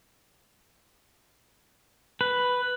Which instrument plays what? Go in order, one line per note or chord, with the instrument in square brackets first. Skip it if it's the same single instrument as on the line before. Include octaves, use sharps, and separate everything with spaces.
[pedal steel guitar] B4